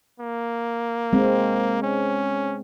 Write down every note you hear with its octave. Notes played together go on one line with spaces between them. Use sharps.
A#3
G#3 C4
C#4